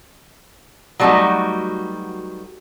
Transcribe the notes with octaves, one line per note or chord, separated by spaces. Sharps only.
F#3 G3 A3 B3 D#4 F#4